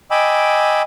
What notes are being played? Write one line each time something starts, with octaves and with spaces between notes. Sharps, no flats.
D#5 G5 G#5 B5 D6 E6